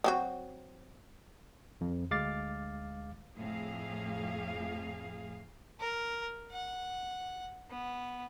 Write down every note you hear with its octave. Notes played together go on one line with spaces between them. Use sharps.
F#3 C4 F#4
F2
D2 G#3 F5 D6 A6
F2 A2 G#4 F5
A#4
F#5
B3